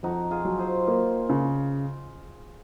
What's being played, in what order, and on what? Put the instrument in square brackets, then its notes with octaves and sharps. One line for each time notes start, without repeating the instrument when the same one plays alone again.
[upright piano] F2 [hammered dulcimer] D#4 F#4
[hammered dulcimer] F4 G#4
[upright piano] F#3
[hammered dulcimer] G#4 C5
[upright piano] A#3
C#3